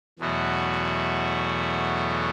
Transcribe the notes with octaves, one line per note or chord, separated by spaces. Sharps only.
E2 B2 F#3 A3 F#4